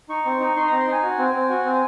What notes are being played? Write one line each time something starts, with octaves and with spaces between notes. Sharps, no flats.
D#4 C#6
C4
D#4
D#4 C6
C4 A#5
C6
D#4 G#5
F#4
C4
C4
F#4
C4